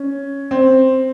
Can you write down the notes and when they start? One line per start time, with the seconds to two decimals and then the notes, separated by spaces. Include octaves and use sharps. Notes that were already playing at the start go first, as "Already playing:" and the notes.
Already playing: C#4
0.51 C4